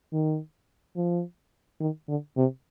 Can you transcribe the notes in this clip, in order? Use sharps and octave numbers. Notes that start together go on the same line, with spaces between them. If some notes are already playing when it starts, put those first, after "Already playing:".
D#3
F3
D#3
D3
C3